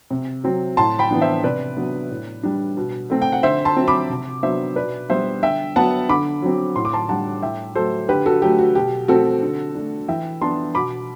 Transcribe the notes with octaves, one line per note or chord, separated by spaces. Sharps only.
C3
F#3 C4
A2 A5 C6
G5 B5
E3 B3 D4
C5 E5
C3 B4 D5
F#3 B3 D4
A2
G3 D4
B2
A3 C4
G5
F#5
D3 C5 E5
A5 C6
F#3 C4
B5 D6
C3
F#3 B3 D4 C5 E5
B2 B4 D5
G3 B3 D4 C5 E5
D3 E5 G5
F#3 B3 F#5 A5
D3 B5 D6
F#3 C4
A2 C6
D6
A5 C6
G3 D4 F#5 A5
A2 E5 G5
F#3 A3 A4 C5
D3 G4 B4
F#4 A4
F#3 A3 G4
F#4
B2 G4
A3 C4 F#4 A4
D3
A3 D4
E3 E5 G5
B3 D4 A5 C6
B2 B5 D6